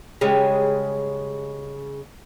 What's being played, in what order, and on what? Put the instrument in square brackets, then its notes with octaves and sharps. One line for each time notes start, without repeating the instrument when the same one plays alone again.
[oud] C#3 G3 G#3